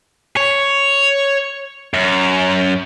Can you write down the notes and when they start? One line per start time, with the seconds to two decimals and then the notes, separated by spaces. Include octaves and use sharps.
0.37 C#5
1.94 F#2